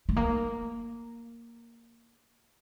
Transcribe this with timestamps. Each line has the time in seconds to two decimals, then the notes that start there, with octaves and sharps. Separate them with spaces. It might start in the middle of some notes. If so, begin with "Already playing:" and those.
0.09 A3
0.16 A#3